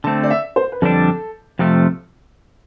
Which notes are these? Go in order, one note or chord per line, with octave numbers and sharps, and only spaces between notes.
D3 A3 C4 A5
D5
E5
C5
B4
F2 D3 G3 D4 A4
F2 C3 F3 A3